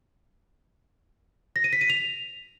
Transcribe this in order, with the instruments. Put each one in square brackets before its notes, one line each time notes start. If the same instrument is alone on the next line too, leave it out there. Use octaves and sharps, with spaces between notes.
[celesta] A#6
D#7
B6
D#7
F7